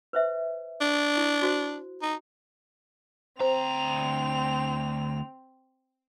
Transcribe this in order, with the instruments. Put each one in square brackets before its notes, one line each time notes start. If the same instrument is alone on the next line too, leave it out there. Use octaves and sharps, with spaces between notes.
[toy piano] B4 C5 E5
[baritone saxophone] D4
[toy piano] E4
F#4 C5
[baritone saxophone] D#4
[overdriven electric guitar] D2 A#5 [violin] C4 F7 [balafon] C5